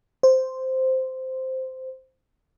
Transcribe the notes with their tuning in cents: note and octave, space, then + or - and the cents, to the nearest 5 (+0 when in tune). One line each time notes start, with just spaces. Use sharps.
C5 -5